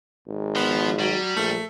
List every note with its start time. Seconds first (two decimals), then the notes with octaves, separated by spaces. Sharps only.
0.27 G#1
0.56 F3 B3
0.99 F#3 G3
1.36 A#1 A3